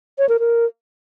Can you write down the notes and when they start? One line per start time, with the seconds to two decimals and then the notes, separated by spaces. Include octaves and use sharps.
0.19 C#5
0.29 A#4
0.39 A#4